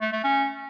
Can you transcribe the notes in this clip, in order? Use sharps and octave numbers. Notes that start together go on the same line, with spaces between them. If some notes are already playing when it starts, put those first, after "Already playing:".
A3
A3
C#4